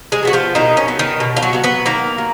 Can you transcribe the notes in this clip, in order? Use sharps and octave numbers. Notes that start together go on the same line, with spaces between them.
G#3 G#4
F#3 B3 F#4
F3 F4
B2 D#3 D#4
C#4
F#3 B3
D#3 D#4
B2
F4
F#3 F#4
F#3 B3
B3 B4
D#3 A#3 A#4
F#3